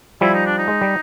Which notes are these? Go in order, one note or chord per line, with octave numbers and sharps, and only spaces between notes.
F3 G3 E4
D#4
D4
D#4
G#3
G3